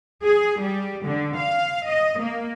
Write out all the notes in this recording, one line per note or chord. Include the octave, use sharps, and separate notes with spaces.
G#4
G3
D3
F5
D#5
A#3